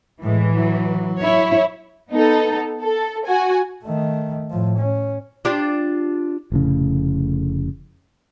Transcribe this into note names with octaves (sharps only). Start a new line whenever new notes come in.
A2 E3 G#3
F#3
E4 C#5
B3 D#4 A4
A4
F#4 G#5
D#3 A3
A2 F3
C#4
D4 F4 G4
F1 A2 C#3